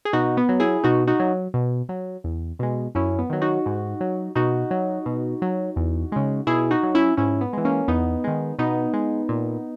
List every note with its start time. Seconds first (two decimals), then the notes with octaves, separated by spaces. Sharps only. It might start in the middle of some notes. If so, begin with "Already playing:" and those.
0.05 G#4
0.13 B2 D#4 F#4
0.37 B3
0.49 F#3
0.60 E4 G#4
0.84 B2 D#4 F#4
1.07 D#4 F#4
1.20 F#3
1.54 B2
1.89 F#3
2.24 E2
2.59 B2 G#3
2.95 F#2 C#4 E4
3.19 B3
3.30 D#3 F#3
3.42 D#4 F#4
3.66 G#2
4.01 F#3
4.36 B2 D#4 F#4
4.71 F#3
5.06 B2
5.42 F#3
5.76 E2
6.12 C#3 G#3
6.47 B2 E4 G#4
6.71 D#4 F#4
6.83 F#3
6.95 C#4 E4
7.17 G#2 C#4 E4
7.41 B3
7.53 E3 G#3
7.65 A#3 C#4
7.88 E2 B3 D#4
8.24 D#3 G#3
8.59 B2 B3 D#4
8.94 G#3
9.29 A#2